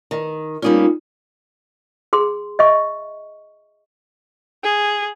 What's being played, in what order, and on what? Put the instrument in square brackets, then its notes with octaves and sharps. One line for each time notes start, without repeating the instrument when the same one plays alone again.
[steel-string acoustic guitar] D#3
[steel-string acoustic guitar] G3 A#3 C#4 [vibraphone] D#4 F4
[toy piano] G#4 C6
D#5 E5 C#6
[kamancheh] G#4